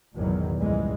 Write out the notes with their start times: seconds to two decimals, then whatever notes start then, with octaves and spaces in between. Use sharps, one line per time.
0.16 G#1 E2 B2 D#3 F#3
0.59 C#2 G#2 E3 G3 G#3